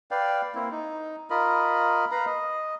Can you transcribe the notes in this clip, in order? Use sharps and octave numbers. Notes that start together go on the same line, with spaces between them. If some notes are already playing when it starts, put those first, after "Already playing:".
B4 D5 F5 G5
A#3 C4 E4
D#4
F4 A#4 D#5 B5
B4 F5 A#5 B5
D#5